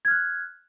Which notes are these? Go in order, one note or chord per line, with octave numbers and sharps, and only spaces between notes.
F6 F#6 G#6